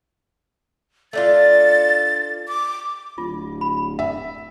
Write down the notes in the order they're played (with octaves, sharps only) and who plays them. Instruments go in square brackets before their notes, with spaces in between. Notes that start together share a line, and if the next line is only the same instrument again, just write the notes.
[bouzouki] A3 D4 F4 [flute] A6
[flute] D6
[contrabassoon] D1 [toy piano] F4
[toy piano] B5
[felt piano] E5